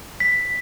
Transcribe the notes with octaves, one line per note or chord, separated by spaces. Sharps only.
B6